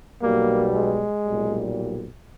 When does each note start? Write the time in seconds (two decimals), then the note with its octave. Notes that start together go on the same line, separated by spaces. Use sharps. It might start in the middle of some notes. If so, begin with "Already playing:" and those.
0.22 B1 B2 G3 A#3
0.74 G#3
1.25 B1 A#2 G3